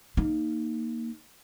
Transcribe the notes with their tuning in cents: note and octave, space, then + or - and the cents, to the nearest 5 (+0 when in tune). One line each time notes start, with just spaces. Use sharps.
A#3 +0 D#4 +0